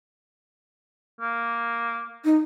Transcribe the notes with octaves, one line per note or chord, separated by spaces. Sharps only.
A#3
D#4